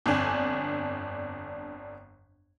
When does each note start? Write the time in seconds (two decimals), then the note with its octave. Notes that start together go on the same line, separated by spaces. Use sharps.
0.06 G1 F2 D4 G#5